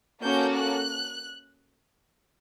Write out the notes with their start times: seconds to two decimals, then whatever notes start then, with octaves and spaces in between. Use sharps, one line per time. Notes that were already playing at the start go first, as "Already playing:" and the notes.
0.21 A#3 C#4 F#4 A4 G6
0.56 F#6